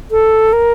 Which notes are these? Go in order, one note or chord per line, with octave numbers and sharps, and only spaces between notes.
A4
A#4